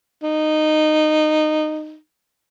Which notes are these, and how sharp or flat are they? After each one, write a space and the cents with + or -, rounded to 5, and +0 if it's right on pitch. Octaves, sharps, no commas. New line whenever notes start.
D#4 -15